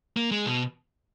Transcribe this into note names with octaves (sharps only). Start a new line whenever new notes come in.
A#3
G#3
B2